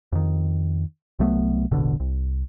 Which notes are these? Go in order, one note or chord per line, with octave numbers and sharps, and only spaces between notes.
F2 D#3
C2 F#3 A3 B3
E1 A1 B2 D3
C2